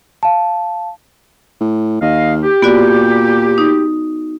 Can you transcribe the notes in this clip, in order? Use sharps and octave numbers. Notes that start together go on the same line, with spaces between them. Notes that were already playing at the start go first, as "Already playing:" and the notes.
F5 A5
A2
D#2 D#5 F5
G4
A#2 B3 F#4 D5
D#4